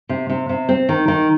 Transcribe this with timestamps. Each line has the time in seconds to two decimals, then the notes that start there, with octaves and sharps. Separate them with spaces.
0.09 C3
0.30 C3
0.49 C3
0.69 C4
0.89 D#3
1.08 D#3